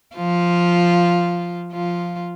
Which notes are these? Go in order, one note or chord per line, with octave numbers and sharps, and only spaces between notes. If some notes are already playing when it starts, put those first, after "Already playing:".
F3 F4
F3 F4